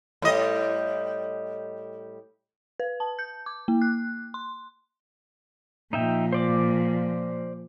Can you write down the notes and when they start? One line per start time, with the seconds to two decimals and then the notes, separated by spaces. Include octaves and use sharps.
0.22 A2 G3 D#5
2.80 B4
3.00 A5
3.19 G6
3.46 D6
3.68 A#3
3.82 F#6
4.34 C6
5.93 A#2 F3 D#4 E5 G5
6.33 C5 D5 D6